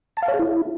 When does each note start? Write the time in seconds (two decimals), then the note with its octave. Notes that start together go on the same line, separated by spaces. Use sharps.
0.17 A5
0.23 F5
0.28 C#5
0.34 G#4
0.39 E4